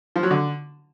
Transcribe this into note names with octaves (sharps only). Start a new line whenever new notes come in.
F3
F#3
D3